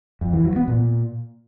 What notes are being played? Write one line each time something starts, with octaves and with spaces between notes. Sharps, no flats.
F2
E3
F#3
B3
A#2